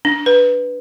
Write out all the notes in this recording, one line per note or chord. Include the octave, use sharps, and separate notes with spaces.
D4
B4